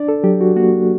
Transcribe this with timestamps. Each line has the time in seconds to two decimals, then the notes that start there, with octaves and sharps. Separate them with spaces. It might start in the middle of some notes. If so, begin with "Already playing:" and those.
Already playing: D4 D5
0.08 A4
0.24 F#3 G4
0.41 F#4
0.56 A#3 F#4